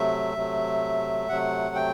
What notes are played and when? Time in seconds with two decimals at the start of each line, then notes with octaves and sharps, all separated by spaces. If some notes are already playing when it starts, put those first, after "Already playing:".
Already playing: C3 F#3 A3 E5
0.36 C3 F#3 A3
1.29 C3 F#3 A3 F#5
1.75 G5